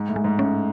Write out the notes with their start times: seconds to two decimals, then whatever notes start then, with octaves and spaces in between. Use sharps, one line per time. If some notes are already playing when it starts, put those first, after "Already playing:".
Already playing: G#2
0.09 A2
0.16 G#3
0.24 G#2
0.39 A2 C#4